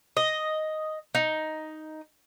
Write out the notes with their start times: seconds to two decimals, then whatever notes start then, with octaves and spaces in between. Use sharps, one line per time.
0.17 D#5
1.15 D#4